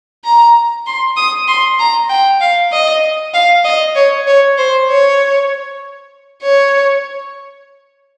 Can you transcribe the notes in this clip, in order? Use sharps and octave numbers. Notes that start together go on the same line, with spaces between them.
A#5
C6
D#6
C6
A#5
G5
F5
D#5
F5
D#5
C#5
C#5
C5
C#5
C#5